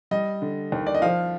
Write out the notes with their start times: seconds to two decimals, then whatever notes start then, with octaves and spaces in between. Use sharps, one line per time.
0.11 G3 D#5
0.42 D3
0.72 D#2
0.87 D5
0.95 D#5
1.02 F3 F5